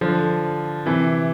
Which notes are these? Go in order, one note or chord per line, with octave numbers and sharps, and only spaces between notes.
D3 F3
C3 E3